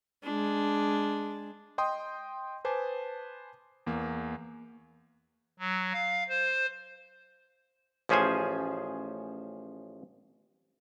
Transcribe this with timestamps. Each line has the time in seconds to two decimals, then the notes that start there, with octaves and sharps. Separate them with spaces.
0.24 G#3 D4
1.78 D#5 G5 C6 D#6
2.65 B4 C5 G#5 A5 D6
3.87 E2 A#3
5.59 F#3
5.93 F5
6.29 C5
8.09 A1 F3 C#4 G#4 C5 G#5